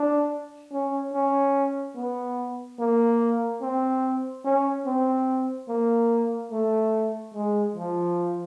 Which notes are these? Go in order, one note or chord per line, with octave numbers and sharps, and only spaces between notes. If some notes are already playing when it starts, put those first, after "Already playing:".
Already playing: D4
C#4
C#4
B3
A#3
C4
C#4
C4
A#3
A3
G#3
F3